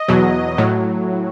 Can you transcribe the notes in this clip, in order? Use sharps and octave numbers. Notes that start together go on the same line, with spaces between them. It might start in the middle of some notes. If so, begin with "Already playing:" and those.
Already playing: D#5
E2 B2 F#3
A2 F#3